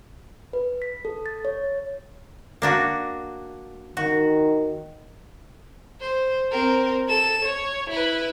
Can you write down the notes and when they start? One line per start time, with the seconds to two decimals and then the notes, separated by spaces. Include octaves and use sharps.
0.53 B4
0.82 B6
1.05 A4
1.26 A6
1.45 C#5
2.62 A#3 D4 F#4
3.97 D#3 F#4
6.01 C5
6.52 C4 A#4
7.08 A4 E7
7.45 C#5
7.91 E4 B4